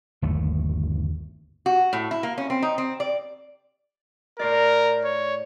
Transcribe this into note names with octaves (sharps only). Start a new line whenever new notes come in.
G1 D#2 A3
F#4
A2
E4
A#3
C#4
C4
D#4
C4
D5
A2 A#4 C5 D5
C#5